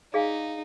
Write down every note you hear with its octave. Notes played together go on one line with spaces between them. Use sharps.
D#4 G#4 D5 F5 G#5